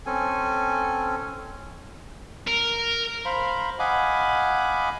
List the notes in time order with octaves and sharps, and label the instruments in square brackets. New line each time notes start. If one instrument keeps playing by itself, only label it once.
[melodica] C4 C#4 A4 G#5
[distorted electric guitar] A#4
[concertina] C5 F5 A#5 B5
D#5 F5 F#5 G#5 B5 D6